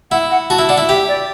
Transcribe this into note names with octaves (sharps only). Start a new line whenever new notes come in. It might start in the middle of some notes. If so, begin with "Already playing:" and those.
E4 F#5
F#5
F#4 A5
E4
D4 F#5
E4
G4 E5
D5